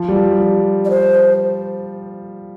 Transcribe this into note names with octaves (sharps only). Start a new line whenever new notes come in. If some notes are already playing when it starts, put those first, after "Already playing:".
Already playing: F3
G3
F3
G3
D5
C5